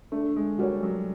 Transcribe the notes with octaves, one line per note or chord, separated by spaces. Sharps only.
A3 D4
G#3
G3 F#4 A#4 C#5
F#3